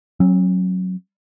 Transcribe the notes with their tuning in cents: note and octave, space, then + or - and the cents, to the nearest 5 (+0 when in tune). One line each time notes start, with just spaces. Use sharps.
F#3 +0 C#4 -45